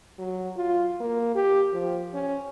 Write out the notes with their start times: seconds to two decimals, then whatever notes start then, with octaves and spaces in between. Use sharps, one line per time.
0.19 F#3
0.56 F4
1.01 A#3
1.35 G4
1.73 F3
2.14 C#4